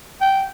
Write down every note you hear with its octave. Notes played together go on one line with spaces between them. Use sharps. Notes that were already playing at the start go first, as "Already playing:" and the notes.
G5